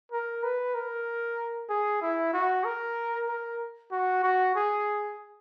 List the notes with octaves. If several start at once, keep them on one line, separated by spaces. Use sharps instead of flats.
A#4
B4
A#4
G#4
E4
F#4
A#4
A#4
F#4
F#4
G#4